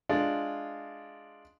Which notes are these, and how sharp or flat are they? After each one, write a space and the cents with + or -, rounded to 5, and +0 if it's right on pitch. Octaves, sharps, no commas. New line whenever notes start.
G#3 +0 D4 +0 F4 -5